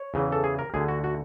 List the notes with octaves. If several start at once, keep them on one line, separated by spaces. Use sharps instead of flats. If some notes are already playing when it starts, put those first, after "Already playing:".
Already playing: C#5
E2 C#3 E3
A4
G#4
A#4
D2 D3 G#4
F#4
F#4